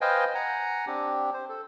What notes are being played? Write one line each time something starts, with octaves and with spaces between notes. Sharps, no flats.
B4 C5 D#5 F5 G5 G#5
F#5 G#5 A#5
C4 D4 G4
C5
A4